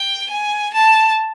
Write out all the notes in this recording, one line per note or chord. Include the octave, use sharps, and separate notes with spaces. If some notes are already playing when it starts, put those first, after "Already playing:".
Already playing: G5
G#5
A5